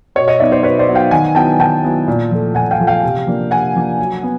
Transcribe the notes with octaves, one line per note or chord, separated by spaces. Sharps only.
B2 C#5 D#5
C#5 D#5
F#3 B3 D#4 D5 E5
C5 D5
B2 B4 C#5
C5 D5
F#3 B3 D#4
F5 G5
D#3 F#5 G#5
F#3 B3 E4 G5 A5
D#3 G5 A5
F#3 B3 E4
A#2
F3 A3
A#2 F#5 G#5
F5 G5
F3 A3
F5 G5
C3
F3 A#3 D4
C3 F#5 G#5
F3 A#3 D4
F#3
B3